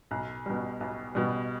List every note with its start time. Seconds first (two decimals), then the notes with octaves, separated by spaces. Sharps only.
0.11 B1
0.46 B2 G3
0.80 B1
1.15 B2 G3